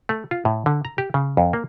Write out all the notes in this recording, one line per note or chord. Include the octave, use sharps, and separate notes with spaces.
A3
F4
A2
D3
A#5
G4
C#3
F2
A#3